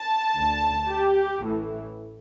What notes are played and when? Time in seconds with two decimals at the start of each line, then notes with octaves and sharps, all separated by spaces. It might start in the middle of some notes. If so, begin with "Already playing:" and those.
Already playing: A5
0.36 D2 D3
0.89 G4
1.43 A1 A2 E3